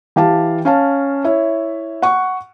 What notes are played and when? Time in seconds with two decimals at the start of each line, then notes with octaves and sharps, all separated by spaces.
0.16 E3 G4 F5 A5
0.65 C#4 F5 A5
1.24 E4 C#5 E5
2.02 F#5 C#6